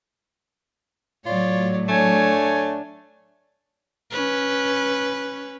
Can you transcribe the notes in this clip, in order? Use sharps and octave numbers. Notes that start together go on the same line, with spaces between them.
A2 F#3 F4 C#5 D5
A3 D4 C#5 G#5
C#4 B4